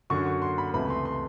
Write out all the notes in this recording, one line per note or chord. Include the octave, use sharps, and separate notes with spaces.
F#2 D3 F#3 C#6
C#6
C6
B5
C#2 C3 E3 A3 B5
C6
C6